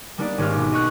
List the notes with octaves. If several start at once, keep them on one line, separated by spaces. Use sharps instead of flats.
G3 A#3 B3 D4 D#4 D5
G#1 C#4 G4 F6
B2 B3 G4
D#5 C#6 F#6